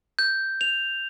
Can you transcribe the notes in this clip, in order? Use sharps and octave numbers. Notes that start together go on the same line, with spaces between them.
G6
F7